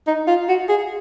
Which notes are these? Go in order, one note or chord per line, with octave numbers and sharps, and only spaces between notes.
D#4
F4
F#4
G#4